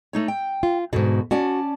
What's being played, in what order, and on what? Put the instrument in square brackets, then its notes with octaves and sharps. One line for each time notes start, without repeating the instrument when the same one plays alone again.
[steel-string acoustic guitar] A3 D#4 C#5
G5
[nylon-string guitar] F4
[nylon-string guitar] F2 G#2 [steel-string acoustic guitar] B2 D3 F#4
[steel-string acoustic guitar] C#4 D5 A5 [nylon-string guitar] F#4